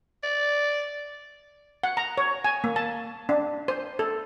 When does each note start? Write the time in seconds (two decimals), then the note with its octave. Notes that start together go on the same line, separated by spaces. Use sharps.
0.23 D5
1.83 F#5
1.97 A#5
2.18 C#5
2.45 G#5
2.64 A#3
2.76 A5
3.29 D4
3.68 C5
3.99 A4